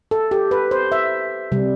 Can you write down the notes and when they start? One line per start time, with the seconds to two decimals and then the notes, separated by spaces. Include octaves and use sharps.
0.11 A4
0.31 G4
0.51 B4
0.71 C5
0.92 E5
1.52 C3 G3